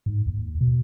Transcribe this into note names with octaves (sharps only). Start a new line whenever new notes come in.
G#2
D#2
B2